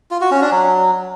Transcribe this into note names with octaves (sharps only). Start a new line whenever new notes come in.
F4
F#4
C#4
D4
F#3